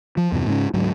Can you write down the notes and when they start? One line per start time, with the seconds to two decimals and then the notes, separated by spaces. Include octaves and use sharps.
0.17 F3
0.32 E2 G2 C3
0.46 G#2 C#3 C#4
0.74 D2 G#2 F#3